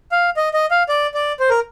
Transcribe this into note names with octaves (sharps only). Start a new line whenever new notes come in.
F5
D#5
D#5
F5
D5
D5
C5
A#4